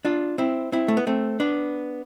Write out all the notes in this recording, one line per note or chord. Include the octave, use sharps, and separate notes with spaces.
D4 F4
C4 E4
C4 E4
A3
B3
A3 C4
B3 D4